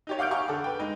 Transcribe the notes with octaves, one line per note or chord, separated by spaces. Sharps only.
D#4 G4 C#5
F5 F#5 D6 F6 G6 D7
G4 F5 G#5 A#5 C#6 D6
D3 A4 F#5 D6
B4 G5
G#3 D#4